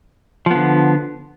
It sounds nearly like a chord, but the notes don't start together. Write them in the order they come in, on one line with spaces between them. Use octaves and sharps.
F3 B3 D3